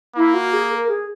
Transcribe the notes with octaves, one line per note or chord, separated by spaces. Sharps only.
A#3 E4
F#4
G#4
A#4
G#4